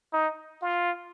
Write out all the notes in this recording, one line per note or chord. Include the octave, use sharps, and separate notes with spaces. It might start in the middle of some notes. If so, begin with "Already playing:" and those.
D#4
F4